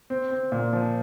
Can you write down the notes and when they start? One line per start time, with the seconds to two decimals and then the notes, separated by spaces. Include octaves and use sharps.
0.10 C4
0.31 C4
0.52 A#2
0.73 F3